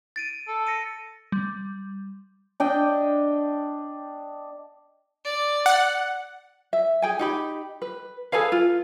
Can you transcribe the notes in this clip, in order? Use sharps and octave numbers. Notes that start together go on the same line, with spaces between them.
A6 D7 D#7
A4
A#6 C#7 D#7
G3
D4 D#5 G5
D5
F#5
E5
G#4 G5 G#5
D#4 G4 B5
B4
G#4 A4 B4 F5
F4